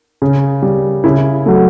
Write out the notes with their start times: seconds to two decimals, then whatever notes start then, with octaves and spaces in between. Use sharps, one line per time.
0.22 C#3
0.62 G3
1.04 C#3 E4
1.46 F#3 A3